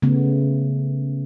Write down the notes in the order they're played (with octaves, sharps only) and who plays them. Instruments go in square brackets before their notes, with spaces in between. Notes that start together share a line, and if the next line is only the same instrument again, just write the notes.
[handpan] C#3 A3 B3